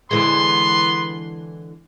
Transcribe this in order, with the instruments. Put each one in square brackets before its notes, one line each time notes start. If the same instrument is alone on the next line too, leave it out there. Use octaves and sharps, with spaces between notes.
[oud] D3 E3 G#3 [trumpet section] B3 B4 C6